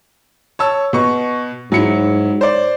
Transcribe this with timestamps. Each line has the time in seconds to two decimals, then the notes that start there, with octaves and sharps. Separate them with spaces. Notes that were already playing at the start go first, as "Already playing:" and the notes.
0.59 C#5 A5 E6
0.93 B2 C#6
1.72 G#2 F#3 E4 C#7
2.41 C5 D5